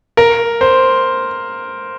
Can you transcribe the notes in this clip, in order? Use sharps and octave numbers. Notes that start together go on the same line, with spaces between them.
A#4
C5